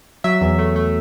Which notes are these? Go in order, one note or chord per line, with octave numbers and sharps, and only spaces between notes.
F#3 E5
E2
A3
A3